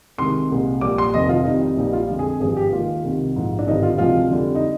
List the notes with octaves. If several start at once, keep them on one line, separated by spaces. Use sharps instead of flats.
C2 C3 D#3 G#3 C6
C2 A#2 G#3
A#1 A#2 G3 D6
C6
F1 F2 D#3 D#5
F4
F2 D#3 G3 D#4
D#4
A#1 A#2 G3 D#4
F4
F2 D3 G#3
G#4
G#1 G2 F3 G#4
G4
D#2 D#3 G#3 F4
C2 C3 D#3
A#1 G#2 F3
D4
G#1 G2 D3 D#4
F4
D2 C3 F3 G#3 F4
F2 D3 G3
D#4